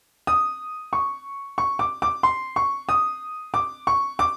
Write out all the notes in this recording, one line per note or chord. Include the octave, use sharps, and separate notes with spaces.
D#6
C#6
C#6
D6
D6
C6
C#6
D#6
D6
C#6
D6